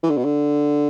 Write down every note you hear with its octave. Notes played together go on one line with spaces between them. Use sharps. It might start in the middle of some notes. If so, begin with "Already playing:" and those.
E3
D3
B2
D3